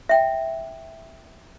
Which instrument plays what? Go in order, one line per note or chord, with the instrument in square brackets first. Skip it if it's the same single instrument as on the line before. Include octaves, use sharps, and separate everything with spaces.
[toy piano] E5 G5